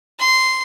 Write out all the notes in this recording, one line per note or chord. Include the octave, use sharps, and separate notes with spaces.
C6